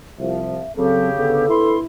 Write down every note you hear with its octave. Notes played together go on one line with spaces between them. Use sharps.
C2 F3 E5
C#3 F#3 C4 G4 A4
D3 B3 A4
G1 E3 E4 B5 C6